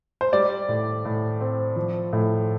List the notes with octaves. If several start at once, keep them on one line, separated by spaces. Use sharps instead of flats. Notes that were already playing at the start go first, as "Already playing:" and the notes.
C5
G3 D5
A2
A2
C4
F3
A2